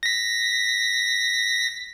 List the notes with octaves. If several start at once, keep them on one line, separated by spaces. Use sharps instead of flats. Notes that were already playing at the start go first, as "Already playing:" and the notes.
A#6 B6